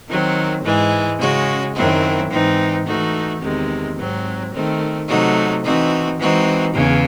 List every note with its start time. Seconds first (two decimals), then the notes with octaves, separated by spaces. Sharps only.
0.09 D#3 F#3 C4
0.64 G#2 E3 G#3
1.20 C#3 G#3 C#4 F#4
1.76 F#2 D#3 F#3 C4 E4
2.31 G#2 E3 C4 D#4
2.86 E3 A3 D#4 F#4
3.41 E2 C3 D#3 G#3
3.97 G#2 F#3 C4
4.53 D#3 A3 C4
5.09 C3 F#3 A3 D#4 F#4
5.64 E3 C4 D#4 F#4
6.19 E3 G#3 C4 D#4 F#4
6.75 E2 C#3 E3